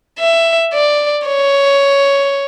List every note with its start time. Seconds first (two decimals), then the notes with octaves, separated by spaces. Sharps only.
0.19 E5
0.73 D5
1.26 C#5